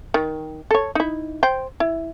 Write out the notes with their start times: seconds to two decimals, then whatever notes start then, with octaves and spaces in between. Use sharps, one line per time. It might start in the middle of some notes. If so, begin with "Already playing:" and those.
0.14 D#3
0.71 A4 C#5
0.95 D#4 E4
1.43 C5 G5
1.80 E4